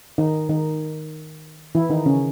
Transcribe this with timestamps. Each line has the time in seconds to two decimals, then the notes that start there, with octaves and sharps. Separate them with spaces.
0.18 D#3 D#4
0.49 D#3 D#4
1.75 E3 E4
1.90 D#3 D#4
2.06 C#3 C#4